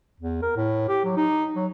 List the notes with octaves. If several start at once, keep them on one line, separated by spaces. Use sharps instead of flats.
E2
A#4
A2
G4
F#3
D#4
F#3